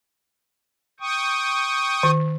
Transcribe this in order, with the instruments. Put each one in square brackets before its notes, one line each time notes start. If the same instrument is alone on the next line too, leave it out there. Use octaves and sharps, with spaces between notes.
[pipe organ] G5 C#6 D#6
[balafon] D#3